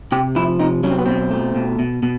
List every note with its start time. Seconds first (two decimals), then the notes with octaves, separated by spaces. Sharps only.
0.12 C3 G4
0.36 F3 E4
0.60 C3 D#4
0.83 F#3 C#4
0.91 C4
0.99 B3
1.06 B2 C4
1.31 A3
1.55 B2
1.79 B2
2.03 B2